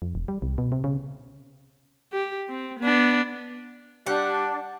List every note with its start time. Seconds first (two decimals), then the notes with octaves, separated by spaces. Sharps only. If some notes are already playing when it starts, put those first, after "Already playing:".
0.02 F2
0.15 E1
0.28 G3
0.42 C2
0.58 B2
0.72 C3
0.84 C#3
2.12 G4
2.49 C4
2.79 B3 D4
4.06 G3 D4 F#5